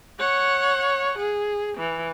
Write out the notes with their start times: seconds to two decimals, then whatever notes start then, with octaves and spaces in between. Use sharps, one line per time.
0.19 C#5 F#5
1.18 G#4
1.78 E3